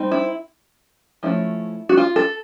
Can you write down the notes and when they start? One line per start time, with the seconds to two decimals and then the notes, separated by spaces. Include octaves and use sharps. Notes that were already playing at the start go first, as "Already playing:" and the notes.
Already playing: G3 C4 D#4
0.11 E4
1.23 F3 A3 C#4 E4
1.89 F#4
1.97 F4
2.16 A4